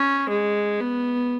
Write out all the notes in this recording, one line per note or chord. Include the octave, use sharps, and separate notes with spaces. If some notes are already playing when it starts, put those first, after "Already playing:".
Already playing: C#4
G#3
B3